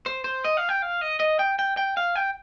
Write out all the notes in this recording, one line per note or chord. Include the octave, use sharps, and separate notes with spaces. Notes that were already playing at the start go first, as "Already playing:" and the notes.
C5
C5
D#5
F5
G5
F5
D#5
D#5
G5
G5
G5
F5
G5